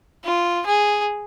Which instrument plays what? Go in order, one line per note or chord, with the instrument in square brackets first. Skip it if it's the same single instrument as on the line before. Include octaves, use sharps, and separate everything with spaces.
[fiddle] F4
G#4